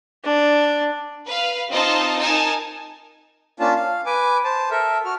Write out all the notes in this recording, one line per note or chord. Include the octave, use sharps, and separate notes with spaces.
D4
B4 F5
C4 D#4 F4 C5 D#5 A5
D#4 A#4 G#5 A5
A#3 C#4 D4 F4 A5
F5
B4 G#5 D6
C5 A5
A4 A#4 E5
F#4 F6